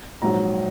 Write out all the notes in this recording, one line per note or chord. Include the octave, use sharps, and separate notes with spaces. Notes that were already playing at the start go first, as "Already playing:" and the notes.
A#1 G#2 F#3 A#5